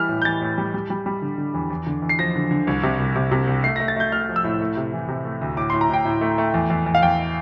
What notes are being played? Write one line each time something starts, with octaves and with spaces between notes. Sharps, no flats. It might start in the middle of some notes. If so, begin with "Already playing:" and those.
Already playing: E3 G3 F6
A2
G6
E3 A6
A2
G3
G3
G3
G3
D3
D3
E2
E2
D3
E2
C7
F3 A#6
D3
D3
C2
C3
C2
C3
C3
C2
A3 C7
A3 A#6
A6
A3 G6
A3 F6
F3
E6
A2
A3
C3
E3
C3
A3
D2
A2 D6
A2 C6
A#5
A2 G5
A2
A3
A3
E2
E2
E2
F5
E2 G5